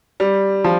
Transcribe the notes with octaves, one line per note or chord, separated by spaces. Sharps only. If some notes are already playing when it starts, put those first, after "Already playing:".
G3
F3